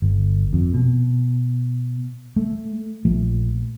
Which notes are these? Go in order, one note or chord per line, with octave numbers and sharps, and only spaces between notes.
G1
F2
B2
A3
A#1 F3 A3